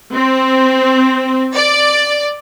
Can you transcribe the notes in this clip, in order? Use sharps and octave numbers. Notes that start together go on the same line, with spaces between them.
C4
D5